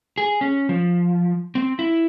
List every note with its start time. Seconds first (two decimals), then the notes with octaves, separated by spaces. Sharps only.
0.18 G#4
0.41 C#4
0.69 F3
1.55 C4
1.79 E4